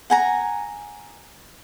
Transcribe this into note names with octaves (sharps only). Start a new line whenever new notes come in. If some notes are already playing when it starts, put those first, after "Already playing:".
F#5 G#5 A#5